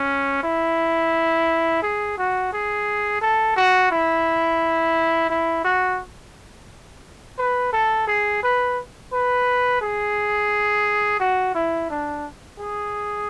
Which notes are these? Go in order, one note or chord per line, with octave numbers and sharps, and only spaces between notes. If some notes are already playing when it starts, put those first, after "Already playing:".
Already playing: C#4
E4
G#4
F#4
G#4
A4
F#4
E4
E4
F#4
B4
A4
G#4
B4
B4
G#4
F#4
E4
D4
G#4